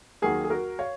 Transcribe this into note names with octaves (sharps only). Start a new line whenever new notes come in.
D#2 D#3 F#3 A#3 G#4
G#4
F#4 A#4
C#5 F5